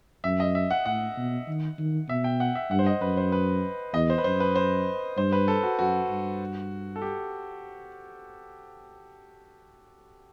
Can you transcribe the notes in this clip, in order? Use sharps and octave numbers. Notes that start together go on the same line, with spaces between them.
F#2 E5
D#5
E5
F#5
A2 F#5
B2
D#3
D#3
B2 E5
G5
F#5
E5
G2 F#5
C5
D#5
F#2 B4
C5
B4
E2 D#5
C5
B4
F#2 C5
B4
C5
G2 C5
B4
A4
F#4
F#2 F#4
G2
A4
G4